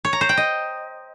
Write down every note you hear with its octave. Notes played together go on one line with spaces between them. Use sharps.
C#5
A#5
C5
G5
D#5